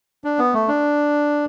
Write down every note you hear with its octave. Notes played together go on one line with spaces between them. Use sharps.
D4
B3
A3
D4